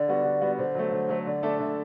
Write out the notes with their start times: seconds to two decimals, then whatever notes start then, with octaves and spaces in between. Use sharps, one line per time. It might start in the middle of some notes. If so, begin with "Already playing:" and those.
Already playing: D3 D5
0.08 G3 B3 F#4
0.25 D3
0.41 G3 B3 F#4
0.58 D3 C5
0.75 F#3 A3
0.92 D3
1.09 F#3 A3
1.26 D3 D5
1.43 A3 D4 A4 E5
1.60 D3 E5